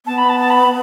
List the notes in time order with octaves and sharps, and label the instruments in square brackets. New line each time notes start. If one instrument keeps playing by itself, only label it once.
[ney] B3 [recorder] A5
[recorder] B5
A5
A5
B5